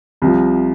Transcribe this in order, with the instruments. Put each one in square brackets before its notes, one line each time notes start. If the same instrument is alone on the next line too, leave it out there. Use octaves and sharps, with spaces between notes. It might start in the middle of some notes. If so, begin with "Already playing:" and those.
[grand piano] C2 C3 F3